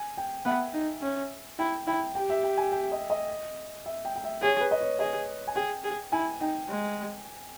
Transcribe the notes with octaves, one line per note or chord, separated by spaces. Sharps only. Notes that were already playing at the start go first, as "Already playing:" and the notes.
Already playing: G#5
G5
B3 E5
D#4
C#4
E4 G5
E4 G5
G4 G5
E5
G5
G#5
G5
D#5
D#5
E5
G5
G5
E5
G#4 C#5
B4
D#5
C#5
G#4 D#5
G#5
G#4 G5
G#4
E4 G#5
D#4 G5
G#3